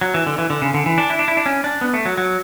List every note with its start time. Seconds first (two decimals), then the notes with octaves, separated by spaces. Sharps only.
0.01 F#3
0.14 E3
0.27 D3
0.38 E3
0.50 D3
0.62 C#3
0.74 D3
0.86 E3
0.98 D4
1.10 E4
1.19 D4
1.28 E4
1.37 D4
1.46 C#4
1.64 D4
1.81 B3
1.94 A3
2.05 F#3
2.17 F#3